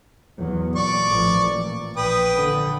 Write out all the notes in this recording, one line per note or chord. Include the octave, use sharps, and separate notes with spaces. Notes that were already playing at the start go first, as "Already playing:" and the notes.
E2 F#3
A#2 D5 C#6 D6
A1 F3
A#2
A#1 B4 G5 D#6
D3